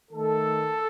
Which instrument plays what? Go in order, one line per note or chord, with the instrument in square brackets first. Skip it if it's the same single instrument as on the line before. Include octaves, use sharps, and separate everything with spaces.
[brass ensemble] D#3 A3 A4